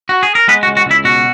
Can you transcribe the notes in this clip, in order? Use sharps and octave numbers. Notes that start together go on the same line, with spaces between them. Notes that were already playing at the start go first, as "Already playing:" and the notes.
F#4
G#4
A#4
G#3 B3 B4
F#4
C#2
F#4
C#2 E4
B2 F#4